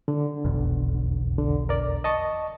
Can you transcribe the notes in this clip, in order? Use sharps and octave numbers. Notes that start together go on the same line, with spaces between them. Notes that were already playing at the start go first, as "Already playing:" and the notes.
D3
F1 B1 E2
D3
A#4 D5
D#5 A5 C#6